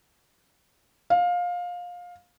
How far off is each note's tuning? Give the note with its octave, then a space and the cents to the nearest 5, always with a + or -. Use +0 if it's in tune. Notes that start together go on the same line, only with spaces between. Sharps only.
F5 +20